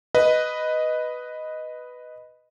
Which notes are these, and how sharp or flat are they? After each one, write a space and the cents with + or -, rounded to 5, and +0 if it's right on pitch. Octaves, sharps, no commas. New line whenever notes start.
B4 +0 D#5 +0